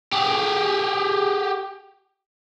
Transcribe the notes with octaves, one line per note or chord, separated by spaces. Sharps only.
G4 G#4